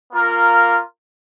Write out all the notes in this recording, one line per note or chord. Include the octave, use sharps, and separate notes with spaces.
A#3 F4 A#4